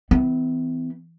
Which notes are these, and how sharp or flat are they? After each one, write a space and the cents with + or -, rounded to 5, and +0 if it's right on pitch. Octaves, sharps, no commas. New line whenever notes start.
E3 -10 C4 -45